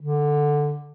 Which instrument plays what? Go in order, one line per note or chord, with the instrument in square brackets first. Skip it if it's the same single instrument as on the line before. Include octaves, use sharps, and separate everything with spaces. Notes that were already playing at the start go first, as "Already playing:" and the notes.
[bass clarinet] D3